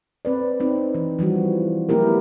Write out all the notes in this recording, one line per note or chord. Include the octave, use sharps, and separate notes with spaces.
C4 B4 D5
C4 D#4
E3
E3 F3 G3 F#4
F#3 A3 B3 E4 G4 A#4